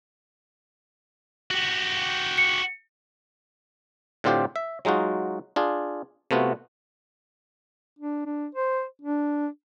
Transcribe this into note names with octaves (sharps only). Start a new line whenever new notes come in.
F#4 G4
C#7
A2 D3 C4 F4 G4 C5
E5
F#3 G#3 D#4 F4 F#4
D4 F4 G#4
C3 A3 B3 F4 F#4
D4
D4
C5
D4